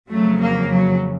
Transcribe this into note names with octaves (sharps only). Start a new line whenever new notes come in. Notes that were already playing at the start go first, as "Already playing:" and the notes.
F2 C#3 F#3 A3
A#3
F#3